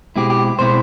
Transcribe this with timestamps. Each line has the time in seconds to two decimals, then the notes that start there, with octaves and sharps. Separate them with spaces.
0.16 B2 G#3 C4 E4 G4
0.30 G4
0.59 B2 G#3 C4 E4 C5